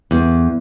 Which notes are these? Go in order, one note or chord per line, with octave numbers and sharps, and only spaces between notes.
E2